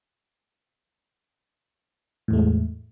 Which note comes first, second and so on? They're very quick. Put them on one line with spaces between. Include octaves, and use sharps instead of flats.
A2 E2 A3 G#3